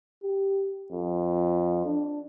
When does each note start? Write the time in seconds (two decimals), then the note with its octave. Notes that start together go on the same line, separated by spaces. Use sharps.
0.23 G4
0.92 F2
1.86 D4